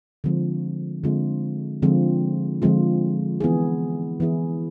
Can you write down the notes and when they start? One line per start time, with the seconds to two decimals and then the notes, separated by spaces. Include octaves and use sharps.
0.24 D3 F3 G#3 C4 F4
1.04 D3 F3 G#3 C4 F4
1.82 D3 F3 G#3 C4 F4
2.62 D3 F3 G#3 C4 F4
3.40 E3 B3 E4 G#4
4.20 E3 B3 E4 G#4